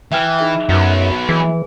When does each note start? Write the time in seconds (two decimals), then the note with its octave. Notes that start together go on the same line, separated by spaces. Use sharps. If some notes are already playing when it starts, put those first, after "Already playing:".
0.12 E3 E5 G5 F6
0.39 D#4 G#4 E5
0.69 F#2 F#3 B3
1.29 E3 G#4